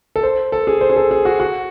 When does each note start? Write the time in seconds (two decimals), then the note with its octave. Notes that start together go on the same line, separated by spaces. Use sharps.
0.16 A4
0.23 C5
0.52 A4
0.67 G#4
0.81 C5
0.90 G#4
0.96 A4
1.11 G#4
1.25 F#4
1.40 F#4